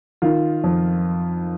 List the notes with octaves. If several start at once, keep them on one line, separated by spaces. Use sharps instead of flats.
D#3 F4
F2